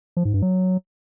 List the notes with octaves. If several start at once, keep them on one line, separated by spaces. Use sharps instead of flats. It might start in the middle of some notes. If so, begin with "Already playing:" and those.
F3
G#2
G2
F#3